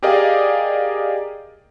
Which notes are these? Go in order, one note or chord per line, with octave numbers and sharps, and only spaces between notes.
G4 G#4 A#4 D5 D#5 F5